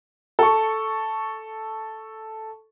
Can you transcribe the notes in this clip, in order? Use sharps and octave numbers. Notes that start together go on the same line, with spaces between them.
A4 C#6